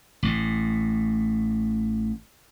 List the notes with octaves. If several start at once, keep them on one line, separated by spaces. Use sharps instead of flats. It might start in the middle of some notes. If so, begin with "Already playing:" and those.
A1 A2